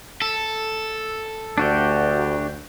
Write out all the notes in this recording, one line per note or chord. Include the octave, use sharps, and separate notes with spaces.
A4
D2 D4 F#4 G4